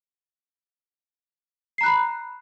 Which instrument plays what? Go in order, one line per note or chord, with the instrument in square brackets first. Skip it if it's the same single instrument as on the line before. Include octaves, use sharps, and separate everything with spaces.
[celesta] C7
A#5
F#6
B5